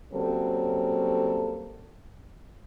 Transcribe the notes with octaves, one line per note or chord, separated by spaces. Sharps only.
C#3 F#3 G3 A#3 C4 A4